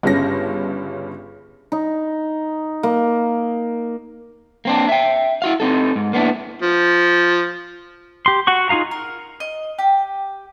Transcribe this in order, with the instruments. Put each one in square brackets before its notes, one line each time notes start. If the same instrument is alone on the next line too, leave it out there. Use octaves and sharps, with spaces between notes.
[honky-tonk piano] G1 G2 C#3 C#4 A#6
[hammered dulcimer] D#4
A#3
[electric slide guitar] A#3 C4 D4
E5 G5
E4 F#4 F5
C4 D#4 A4
G#2
A#3 B3 D4 E4
[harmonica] F3
[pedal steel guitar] G4 C6
F#4 F#5 C#6
D#4 F4 G#4 F5 A#5
[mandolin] A#4
D#5
G4